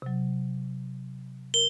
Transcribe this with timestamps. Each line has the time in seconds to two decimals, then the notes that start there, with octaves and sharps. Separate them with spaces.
0.02 C3 F#3
1.54 A#4 G7